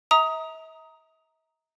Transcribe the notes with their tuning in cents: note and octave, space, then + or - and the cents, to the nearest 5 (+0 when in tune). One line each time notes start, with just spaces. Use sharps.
E5 -45 A#5 +0 D#6 +15